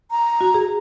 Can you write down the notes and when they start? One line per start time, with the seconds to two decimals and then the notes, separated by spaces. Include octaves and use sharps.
0.11 A#5
0.41 F#4
0.54 G#4